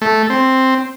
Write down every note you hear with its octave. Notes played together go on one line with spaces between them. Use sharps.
A3
C4